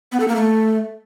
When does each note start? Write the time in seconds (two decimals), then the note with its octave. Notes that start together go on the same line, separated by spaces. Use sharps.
0.12 B3
0.20 A4
0.28 A#3
0.36 A3